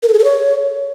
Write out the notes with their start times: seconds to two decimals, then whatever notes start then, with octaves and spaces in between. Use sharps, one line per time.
0.03 A#4
0.08 A4
0.13 G#4
0.19 A4
0.24 C#5